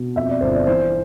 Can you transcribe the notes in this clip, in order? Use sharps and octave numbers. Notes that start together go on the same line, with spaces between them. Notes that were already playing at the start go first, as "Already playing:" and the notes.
Already playing: B2
F2 E5
D5
G1 C5
D5
E3 C5